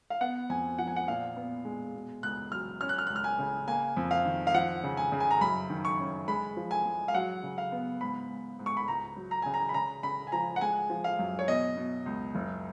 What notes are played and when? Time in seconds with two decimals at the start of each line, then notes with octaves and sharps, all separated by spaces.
0.10 F5
0.21 B3 F#5
0.49 F2 G#5
0.78 F3 F#5
0.87 G#5
0.96 F#5
1.07 A#2 F5
1.36 B3
1.65 G#3
1.95 B2
2.23 C#2 F#6
2.52 F#3 F6
2.81 C#4 F6
2.89 F#6
2.98 F6
3.07 C#2 F#6
3.16 F6
3.24 G#5
3.39 C#3
3.67 A#3 G#5
3.97 F2
4.11 F5
4.25 D#3
4.47 F5
4.54 F3 F#5
4.83 C#3
4.97 G#5
5.12 C#3
5.20 G#5
5.31 A#5
5.41 F#2 B5
5.70 D#3
5.85 C#6
5.99 C#4
6.28 G#3 B5
6.57 F3
6.71 G#5
6.85 G#3
7.08 F5
7.14 F#3 F#5
7.43 C#3
7.58 F5
7.72 B3
8.01 G#2 B5
8.29 G#2
8.59 G#2
8.66 C#6
8.77 B5
8.88 C#2 A#5
9.16 F#3
9.31 A#5
9.42 C#3 G#5
9.54 A#5
9.69 B5
9.74 C#3 A#5
10.03 C#3 B5
10.27 G#5
10.32 F3 A#5
10.56 F#5
10.61 G#3 G#5
10.90 F3
11.04 F5
11.19 F#2
11.39 C#5
11.48 B2 D#5
11.77 B2
12.06 C#2
12.35 F#1